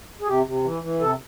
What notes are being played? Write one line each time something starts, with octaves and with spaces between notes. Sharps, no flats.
G#4
C3 G4
C3
E3
E3
C3 A4